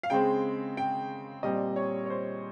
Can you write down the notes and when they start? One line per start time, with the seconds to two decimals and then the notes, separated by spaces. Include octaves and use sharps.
0.03 F5
0.10 C#3 G#3 C4 G5
0.77 G5
1.43 A#2 G3 C4 D#5
1.76 C#5
2.06 C#5
2.10 C5